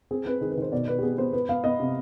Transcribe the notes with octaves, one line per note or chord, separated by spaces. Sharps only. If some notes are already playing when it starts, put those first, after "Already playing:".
C4 G#4
C4 B4
D#3 G#4
B4
D#3 C5
B2 D5
B3 B4
G4
B3 G#4
B3 C5
B3 B4
B3 F5
B3 D#5
C3